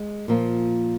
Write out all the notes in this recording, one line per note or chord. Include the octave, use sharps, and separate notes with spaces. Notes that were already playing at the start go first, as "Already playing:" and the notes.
Already playing: G#3
A#2 F3 A#3